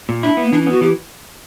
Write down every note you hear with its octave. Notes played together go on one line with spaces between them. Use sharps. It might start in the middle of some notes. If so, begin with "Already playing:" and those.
A#2
D4 E4
B3
A#3
E3 D4
C#4
B3 F#4
E3 G4